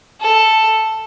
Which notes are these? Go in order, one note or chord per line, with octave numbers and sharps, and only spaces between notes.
A4